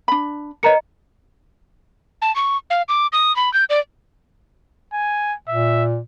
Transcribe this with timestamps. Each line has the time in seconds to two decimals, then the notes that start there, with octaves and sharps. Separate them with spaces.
0.08 D4 B5
0.63 A#4 B4 C#5 D#5 A#5 C#7
2.22 A5
2.36 C#6
2.70 F5
2.89 D6
3.13 D#6
3.36 B5
3.54 G6
3.70 D5
4.93 G#5
5.48 A#2 E5